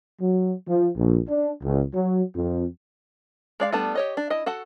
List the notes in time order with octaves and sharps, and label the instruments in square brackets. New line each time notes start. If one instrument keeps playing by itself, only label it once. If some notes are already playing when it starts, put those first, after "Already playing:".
[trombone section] F#3
F3
A#1
D4
C#2
F#3
F2
[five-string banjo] G#3 D5 F5
G3 A3 B3 D4 A5
G4 C#5 D#5
D4
E4 D#5
F#4 A4 F#5